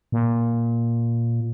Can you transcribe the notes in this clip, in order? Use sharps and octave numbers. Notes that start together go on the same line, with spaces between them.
A#2